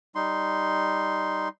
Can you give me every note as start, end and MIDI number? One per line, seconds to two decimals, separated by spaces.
0.15 1.49 55
0.15 1.49 63
0.15 1.49 84